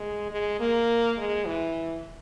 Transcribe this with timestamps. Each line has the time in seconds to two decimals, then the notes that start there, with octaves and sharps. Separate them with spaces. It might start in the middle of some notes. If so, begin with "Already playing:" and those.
Already playing: G#3
0.30 G#3
0.59 A#3
1.17 G#3
1.45 E3